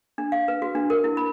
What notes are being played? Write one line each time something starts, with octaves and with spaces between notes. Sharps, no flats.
D4
F5
B4
F#4
D4
A#4
E4
B5